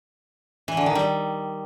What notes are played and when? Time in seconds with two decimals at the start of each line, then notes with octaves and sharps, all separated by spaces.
0.68 E3
0.77 D3
0.86 D#3
0.95 G3